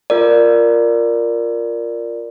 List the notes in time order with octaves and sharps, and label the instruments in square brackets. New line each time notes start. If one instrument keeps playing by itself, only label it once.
[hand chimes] F4 A#4 D5